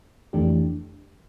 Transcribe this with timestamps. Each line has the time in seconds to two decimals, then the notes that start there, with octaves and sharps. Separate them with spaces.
0.33 F2 E3 A3 D4 G4